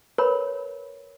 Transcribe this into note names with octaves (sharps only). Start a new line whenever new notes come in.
A#4 B4 C#5 B5